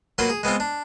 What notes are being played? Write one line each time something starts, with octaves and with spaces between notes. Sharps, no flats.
F#3 A#3 F4 B4 F#5 C6
G#4
G#3 B3 C4 F4
D4